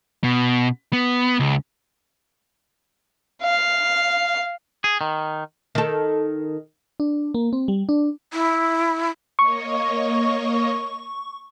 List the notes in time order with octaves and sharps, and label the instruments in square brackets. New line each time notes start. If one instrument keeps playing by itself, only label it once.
[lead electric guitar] B2
B3
C#2
[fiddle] F5
[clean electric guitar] G#4
D#3
[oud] D#3 A4
[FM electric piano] D4
A#3
C4
G3
D4
[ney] E4
[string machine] A#3 C#5 D#5 [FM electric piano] C#6